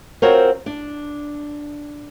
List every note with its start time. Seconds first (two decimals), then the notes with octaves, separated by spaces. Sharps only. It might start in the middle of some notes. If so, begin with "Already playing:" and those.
0.22 C4 F4 F#4 A#4 C5 C#5
0.66 D4